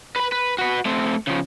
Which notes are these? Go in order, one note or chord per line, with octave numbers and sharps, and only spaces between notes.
B4 B5
B4
F#4 B4
A3 C4
C#3 F3